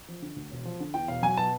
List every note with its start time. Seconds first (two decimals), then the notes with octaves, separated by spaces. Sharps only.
0.08 F3
0.22 D3
0.36 D2
0.51 E1
0.65 F3
0.80 D3
0.94 E2 G5
1.08 E1 F5
1.23 F#3 G#5
1.37 B2 A5